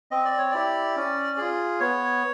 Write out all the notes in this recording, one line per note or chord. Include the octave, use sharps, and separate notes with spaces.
C4 D#5
D5
C#5
E4 G4 D5
C#4
F4 G#4
B3 C#5